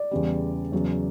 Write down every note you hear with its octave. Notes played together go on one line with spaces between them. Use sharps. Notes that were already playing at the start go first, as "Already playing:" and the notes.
Already playing: D5
E2 C#3 G3
E2 C#3 F#3